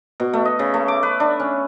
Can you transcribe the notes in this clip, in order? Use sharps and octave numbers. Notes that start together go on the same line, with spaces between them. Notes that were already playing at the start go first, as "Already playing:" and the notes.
B2
A3
D#5
C#3
A3
D6
B4
D4
C#4